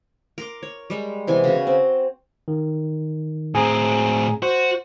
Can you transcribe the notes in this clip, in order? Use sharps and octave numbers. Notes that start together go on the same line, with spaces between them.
A#4 C6 D6
C#5
G3 G#3
C3 E3 B3 G#5
C#3 F#4
C4
D#3
A2 C4 G#4 G#5 A#5
F#4 C5